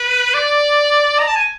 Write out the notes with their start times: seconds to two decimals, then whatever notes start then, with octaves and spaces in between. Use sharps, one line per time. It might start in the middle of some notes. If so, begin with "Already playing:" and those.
Already playing: B4
0.34 D5
1.19 A#5
1.28 A5
1.36 G#5